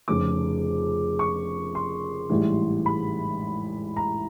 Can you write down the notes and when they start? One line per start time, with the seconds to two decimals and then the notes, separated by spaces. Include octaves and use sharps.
0.08 F1 F2 C#3 D6
1.19 C#6
1.75 C6
2.30 A1 G#2 E3 G3
2.86 B5
3.97 A#5